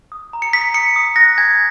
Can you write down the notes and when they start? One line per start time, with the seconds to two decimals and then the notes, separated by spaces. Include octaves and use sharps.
0.12 D#6
0.33 A#5
0.42 C#7
0.53 D#6 B6
0.74 D#6 C#7
0.96 D#6
1.16 F#6 A#6
1.38 G#5 G#6